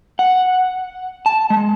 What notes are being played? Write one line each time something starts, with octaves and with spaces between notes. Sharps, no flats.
F#5
A5
G#3